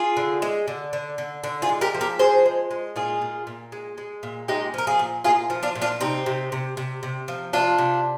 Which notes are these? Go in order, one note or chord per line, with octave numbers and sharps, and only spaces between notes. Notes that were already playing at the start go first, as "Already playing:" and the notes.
Already playing: F4 G#4
D3
G#3
D3
D3
D3
D3
F4 G#4
G#3
G4 A#4
F3
G4 A#4
F3 G#4 C5
G#3
G#3
A#2 F4 G#4
A#2
A#2
G#3
G#3
A#2
G#3 D#4 G4
F3 A#4
F4 G#4
A#2
A#2 F4 G#4
F3
D4 F4
A#2
D4 F4
C3 C4 D#4
C3
C3
C3
C3
F3
C3 D4 F4
C3